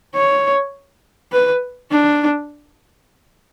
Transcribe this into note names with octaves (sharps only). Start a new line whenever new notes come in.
C#5
B4
D4